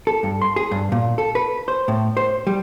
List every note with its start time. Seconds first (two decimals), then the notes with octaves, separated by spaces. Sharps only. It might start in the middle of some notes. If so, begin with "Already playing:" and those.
0.07 A4
0.23 G2
0.42 C6
0.56 G#4
0.71 G2
0.92 A#2
1.18 A4
1.35 B4
1.68 C5
1.88 A2
2.17 C5
2.47 G3